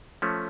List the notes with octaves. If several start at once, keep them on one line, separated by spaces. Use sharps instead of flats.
F3 A3 C#4